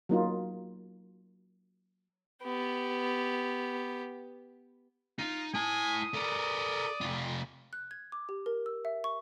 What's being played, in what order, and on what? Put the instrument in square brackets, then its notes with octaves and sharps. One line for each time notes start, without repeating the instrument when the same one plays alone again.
[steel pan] F#3 A#3 D#4 F4
[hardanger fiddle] B3 G4
[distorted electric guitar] D#4 [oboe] F4
[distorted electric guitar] E4 A5 [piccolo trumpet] G#5 [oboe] D#6
[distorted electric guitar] A4 A#4 [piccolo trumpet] D5
[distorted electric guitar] C3 F4
[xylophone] F#6
G#6
D6
G4
A#4
E6
E5
C#6